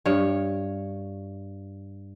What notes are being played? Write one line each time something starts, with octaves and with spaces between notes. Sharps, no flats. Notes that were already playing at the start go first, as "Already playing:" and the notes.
G2 C#5